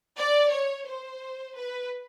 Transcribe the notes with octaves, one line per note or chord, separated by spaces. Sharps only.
D5
C#5
C5
B4